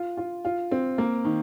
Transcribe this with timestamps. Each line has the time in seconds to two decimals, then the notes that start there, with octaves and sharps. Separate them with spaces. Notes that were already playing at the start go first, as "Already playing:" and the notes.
Already playing: F4
0.17 F4
0.45 F4
0.71 C4
0.98 A#3
1.25 D#3